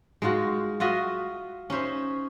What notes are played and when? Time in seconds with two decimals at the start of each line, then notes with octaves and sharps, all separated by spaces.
0.22 G#3 D#4 F4 F#4
0.80 F4 F#4 D#5 E5
1.70 C#4 D#4 C5 E5